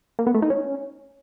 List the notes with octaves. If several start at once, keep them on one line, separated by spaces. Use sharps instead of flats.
A#3
B3
A3
D#4
C#4